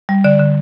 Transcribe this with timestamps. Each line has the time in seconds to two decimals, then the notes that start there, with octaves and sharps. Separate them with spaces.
0.09 G3
0.24 D3 D5
0.40 D3